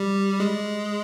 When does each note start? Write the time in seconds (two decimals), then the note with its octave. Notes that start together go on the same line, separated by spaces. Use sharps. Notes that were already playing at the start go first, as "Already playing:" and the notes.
Already playing: G3
0.40 G#3